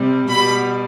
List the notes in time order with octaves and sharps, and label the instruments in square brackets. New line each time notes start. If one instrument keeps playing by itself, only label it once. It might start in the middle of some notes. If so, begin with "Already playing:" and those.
Already playing: [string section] C3 G3
B2 G3 B5